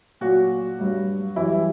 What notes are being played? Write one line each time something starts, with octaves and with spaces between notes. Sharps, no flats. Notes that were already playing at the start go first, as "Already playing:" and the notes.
A#2 F#3 F#4
G2 F#3
F#2 E3 G3 E4